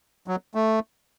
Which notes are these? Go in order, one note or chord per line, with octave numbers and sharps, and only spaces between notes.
F#3
A3